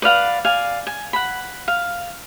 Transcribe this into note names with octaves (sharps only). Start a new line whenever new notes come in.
B4 D5 F5 F#5
D5 F5 G#5
G#5
F#5 B5
F5